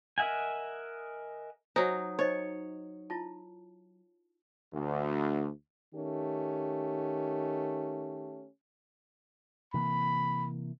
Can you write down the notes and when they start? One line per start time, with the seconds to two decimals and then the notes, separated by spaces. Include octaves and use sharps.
0.18 A#4 D#5 E5 F#5 G#5
1.76 F#3 D#4 C5 G#5
2.19 D#4 C5 C#5 D#5
3.10 E4 F4 A5
4.74 D2
5.94 D#3 A3 C#4 G4
9.74 C3 E3 A#3 B5